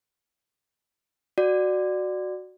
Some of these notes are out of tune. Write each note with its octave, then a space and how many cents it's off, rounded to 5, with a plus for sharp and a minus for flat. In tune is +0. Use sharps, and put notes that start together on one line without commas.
F#4 +0 D5 +15